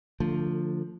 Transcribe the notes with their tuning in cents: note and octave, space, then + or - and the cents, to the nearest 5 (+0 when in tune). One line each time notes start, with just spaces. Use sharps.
D3 +0 F3 +0 A3 +30